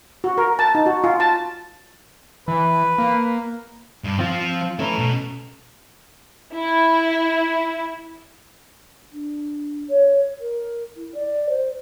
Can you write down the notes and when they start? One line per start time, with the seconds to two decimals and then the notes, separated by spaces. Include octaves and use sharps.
0.24 F#4
0.38 A#4
0.59 A5
0.75 D#4
0.86 F#4
1.04 F4
1.20 A5
2.48 E3 B4
2.98 A#3
4.04 G2
4.19 F3 C4 F4
4.40 C4 F4
4.79 A3 C#4 E4 B4 A#5
4.99 B2
6.54 E4
9.12 D4
9.89 C#5
10.40 A#4
10.96 E4
11.14 D5
11.49 C5